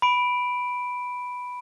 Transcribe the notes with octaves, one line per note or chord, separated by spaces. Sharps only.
B5 D7